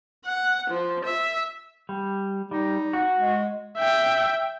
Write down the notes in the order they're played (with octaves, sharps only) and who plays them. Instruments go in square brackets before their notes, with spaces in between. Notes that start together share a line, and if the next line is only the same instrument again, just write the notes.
[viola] F#5
F3
E5
[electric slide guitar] G3
[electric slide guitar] G3 [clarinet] D#4
[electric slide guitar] F#4
[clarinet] G#3
[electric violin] E5 G5